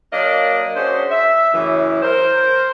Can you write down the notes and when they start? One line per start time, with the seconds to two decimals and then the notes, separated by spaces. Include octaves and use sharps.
0.12 F#3 A#3 D4 A#4 D5 D#5
0.76 C#4 D4 F#4 G#4 C5
1.11 E5
1.53 F#2 A2 C#3 E3
2.03 A#4 C5